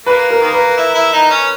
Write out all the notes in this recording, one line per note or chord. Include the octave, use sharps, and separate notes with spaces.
A#3 B4
A#4
D#3 A#3
B4
E4
E4
D#4
C#4